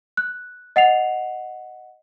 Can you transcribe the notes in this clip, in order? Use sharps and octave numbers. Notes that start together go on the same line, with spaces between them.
F#6
D#5 F#5 C7 F7